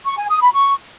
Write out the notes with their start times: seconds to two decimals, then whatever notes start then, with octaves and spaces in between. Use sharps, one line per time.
0.06 C#6
0.18 G#5
0.30 D#6
0.42 B5
0.54 C#6